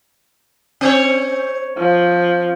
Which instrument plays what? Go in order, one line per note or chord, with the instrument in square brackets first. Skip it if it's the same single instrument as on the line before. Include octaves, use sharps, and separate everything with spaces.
[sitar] C4 C#5
[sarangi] F3